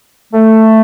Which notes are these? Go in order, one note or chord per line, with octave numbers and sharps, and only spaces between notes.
A3